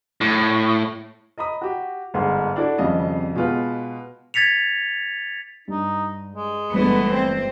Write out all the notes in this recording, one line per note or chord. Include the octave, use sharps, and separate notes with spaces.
A2
D#5 A#5 B5 D#6
F#4 G4
G1 G#2 C6
D4 E4 F#4 A4 D5
G#1 F2 C#3 G3 D#5 F5
B2 G#3 F4 B4
G#6 A6 B6 C#7 F7
G2 D#4
G#3
G1 G2 E3 G#3 A3 B3
C4